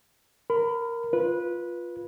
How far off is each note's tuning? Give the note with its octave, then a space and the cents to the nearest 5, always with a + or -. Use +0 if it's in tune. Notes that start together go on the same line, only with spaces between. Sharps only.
A#4 +0 B5 +30
F4 +0 B4 -15